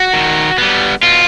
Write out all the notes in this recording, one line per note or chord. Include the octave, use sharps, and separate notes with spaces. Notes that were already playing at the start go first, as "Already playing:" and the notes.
Already playing: F#4
D#3
G3 B3
B2 F4